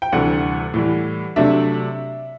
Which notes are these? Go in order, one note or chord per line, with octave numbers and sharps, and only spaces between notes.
G5
D2 C3 E3 G3 D4 D5 F#5
A2 E3 G3
C3 F#3 A3 D4 E5